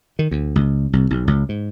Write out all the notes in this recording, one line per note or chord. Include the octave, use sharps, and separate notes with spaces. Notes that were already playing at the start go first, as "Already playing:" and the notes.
D#3
D2
C#2
C2
B1
C#2
G#2